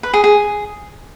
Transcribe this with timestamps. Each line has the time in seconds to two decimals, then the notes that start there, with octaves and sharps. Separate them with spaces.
0.03 B4
0.13 G#4
0.24 G#4